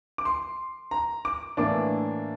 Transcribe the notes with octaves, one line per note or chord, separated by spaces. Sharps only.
D6
C6
A#5
D6
A2 E3 A#3 D4 D6